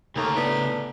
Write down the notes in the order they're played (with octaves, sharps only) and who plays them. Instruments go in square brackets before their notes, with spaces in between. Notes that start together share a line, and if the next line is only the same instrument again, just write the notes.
[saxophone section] D#2 A3 [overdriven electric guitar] C#3 A#5
[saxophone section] A2 B3 D4